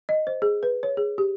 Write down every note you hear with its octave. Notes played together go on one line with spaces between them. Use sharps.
D#5
C5
G#4
B4
C#5
G#4
G4